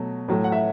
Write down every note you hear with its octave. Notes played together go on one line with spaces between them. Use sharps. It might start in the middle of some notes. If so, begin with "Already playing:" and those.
Already playing: B2 F#3 A3
A2 F#3 A3
F#5
E5